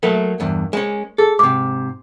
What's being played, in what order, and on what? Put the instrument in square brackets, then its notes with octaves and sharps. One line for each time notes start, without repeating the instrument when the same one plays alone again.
[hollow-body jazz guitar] F#3 A3 A#3 [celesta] A#4
[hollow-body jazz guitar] E2 G2
G#3 C#4
[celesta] G#4 [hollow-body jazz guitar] A4
[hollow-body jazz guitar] G#2 C3 [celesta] D6